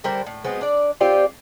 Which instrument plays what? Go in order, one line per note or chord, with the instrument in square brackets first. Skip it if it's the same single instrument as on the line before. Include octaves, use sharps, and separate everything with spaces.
[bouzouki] D3 G3 A#4 C5
A2
F#3 G#3 B3 C4
D4 D5
C4 F4 G4 D5